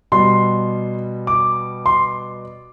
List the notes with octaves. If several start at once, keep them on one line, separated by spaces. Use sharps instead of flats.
B2 G3 C6
D6
C6